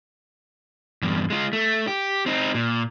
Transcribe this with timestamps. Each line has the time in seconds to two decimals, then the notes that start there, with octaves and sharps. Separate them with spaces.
1.02 E2 G2
1.30 G#3 F4
1.53 A3
1.87 G4
2.26 C4 D#4
2.54 A#2